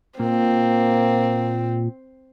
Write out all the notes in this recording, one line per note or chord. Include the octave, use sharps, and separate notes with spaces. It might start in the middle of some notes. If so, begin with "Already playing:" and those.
A#2 A#3 C4